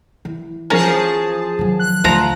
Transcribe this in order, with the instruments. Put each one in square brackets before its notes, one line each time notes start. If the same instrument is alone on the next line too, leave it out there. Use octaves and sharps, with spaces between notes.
[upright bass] E3
[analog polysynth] F3 G#4 A5 [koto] C#4 A#4
[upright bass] D#3 F#3
[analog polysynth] F#6
[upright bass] D2 D3 [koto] F3 A#5